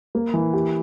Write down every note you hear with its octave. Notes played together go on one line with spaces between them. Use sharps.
A#3
E3
G4